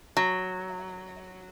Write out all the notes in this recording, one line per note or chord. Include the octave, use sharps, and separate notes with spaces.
F#3